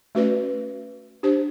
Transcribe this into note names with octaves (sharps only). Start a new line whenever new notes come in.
A3 C#4 F#4 B4 D5
D4 G4 C5